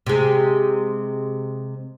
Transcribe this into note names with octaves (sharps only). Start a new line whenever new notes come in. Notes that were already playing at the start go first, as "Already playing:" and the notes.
C3 G#3